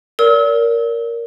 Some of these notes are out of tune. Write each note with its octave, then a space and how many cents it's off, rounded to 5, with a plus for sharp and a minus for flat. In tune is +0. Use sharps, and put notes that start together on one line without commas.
A#4 +0 D5 -35 E6 -35